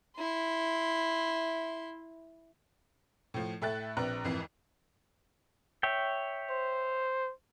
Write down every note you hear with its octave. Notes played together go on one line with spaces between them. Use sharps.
E4 C6
A2 F3
A2 A4 E5 G5 F#6 A6
A#1 C4 D4 B4 A#5 F#6
G#1 F2 E3 C7
C#5 E5 G5
C5